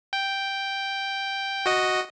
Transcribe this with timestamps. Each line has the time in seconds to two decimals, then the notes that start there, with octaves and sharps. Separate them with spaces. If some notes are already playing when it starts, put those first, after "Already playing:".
0.13 G5
1.66 F#4 D#5